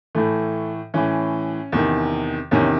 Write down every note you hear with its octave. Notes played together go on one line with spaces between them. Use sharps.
A2 E3 A3
A2 E3 C#4
E2 C3 D#3
E2 C3 D#3 C#4